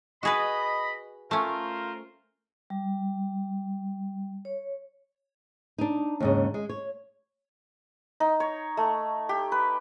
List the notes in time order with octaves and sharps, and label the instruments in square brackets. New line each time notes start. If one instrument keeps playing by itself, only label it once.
[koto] F#4 G#4 B4 [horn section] D#5 B5
[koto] A3 C#4 [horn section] F4 A#4 C5
[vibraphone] G3
C#5
[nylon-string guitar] D4 D#4
D#2 G#2 C#3
G#3
C#5
[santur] D#4
C#5
A3
G4
B4